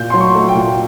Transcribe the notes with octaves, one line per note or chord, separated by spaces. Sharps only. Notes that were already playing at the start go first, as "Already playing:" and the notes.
Already playing: A#2 G6
F#3 C6
C#6
A3
G5
A#2